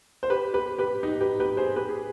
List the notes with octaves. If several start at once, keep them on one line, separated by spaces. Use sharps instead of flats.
C5
G4 B4
G4 B4
G4 B4
D#4 G4
G4 B4
G4 B4
G#4 C5
G4 B4
G#4